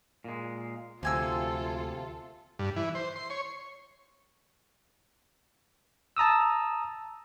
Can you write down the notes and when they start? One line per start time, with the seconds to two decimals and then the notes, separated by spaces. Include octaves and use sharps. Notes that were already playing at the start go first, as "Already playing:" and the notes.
0.24 A#2 G#3
1.03 D2 C3 F3 A#3 F4 A4 G#5 E6
2.59 G2
2.76 E3
2.95 C5
3.16 C6
3.30 C#5
6.17 A5 A#5 D#6 E6